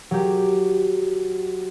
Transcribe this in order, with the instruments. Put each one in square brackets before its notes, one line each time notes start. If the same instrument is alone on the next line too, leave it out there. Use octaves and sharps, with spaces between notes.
[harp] F#3 G4